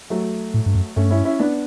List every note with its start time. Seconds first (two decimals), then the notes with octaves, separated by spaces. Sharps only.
0.10 F#3 A3
0.54 A2
0.66 G2
0.75 F#2
0.96 G2 A3 C#4
1.10 C#4 E4
1.24 C#4 E4
1.39 B3 D4